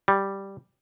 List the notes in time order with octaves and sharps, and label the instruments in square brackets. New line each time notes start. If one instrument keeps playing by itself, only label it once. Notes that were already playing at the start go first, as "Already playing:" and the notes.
[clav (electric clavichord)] G3